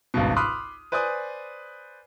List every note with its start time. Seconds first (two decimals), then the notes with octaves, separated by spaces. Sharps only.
0.14 G#1 C#2 G2 B2
0.36 B5 C6 D6 D#6 F6 F#6
0.92 B4 C5 D5 G#5 D#6